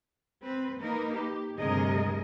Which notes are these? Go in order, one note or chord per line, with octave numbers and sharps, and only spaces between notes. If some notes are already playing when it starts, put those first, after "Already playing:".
C4 B4
A#3 D#4 A#4 B4
G4
D2 G2 C3 G#4 A#4 D#5